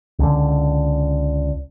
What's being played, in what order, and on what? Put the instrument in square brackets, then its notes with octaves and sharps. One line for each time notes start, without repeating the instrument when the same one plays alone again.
[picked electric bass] C#2 D3